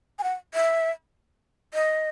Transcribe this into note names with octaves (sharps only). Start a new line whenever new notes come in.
G#5
F#5
E5
D#5